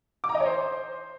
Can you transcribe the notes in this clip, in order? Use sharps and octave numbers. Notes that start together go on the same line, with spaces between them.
D6
A#5
D#5
C#5
C5